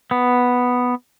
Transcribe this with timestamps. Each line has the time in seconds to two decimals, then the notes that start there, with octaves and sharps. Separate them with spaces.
0.11 B3